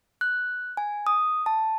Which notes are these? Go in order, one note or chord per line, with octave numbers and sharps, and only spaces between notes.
F#6
G#5
D#6
A5